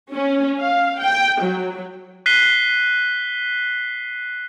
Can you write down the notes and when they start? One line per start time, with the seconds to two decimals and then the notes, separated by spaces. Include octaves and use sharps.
0.12 C#4
0.57 F5
1.00 G5
1.41 F#3
2.26 F#6 B6 C7 D#7 G7